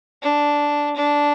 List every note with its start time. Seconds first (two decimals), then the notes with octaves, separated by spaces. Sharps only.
0.22 D4
0.96 D4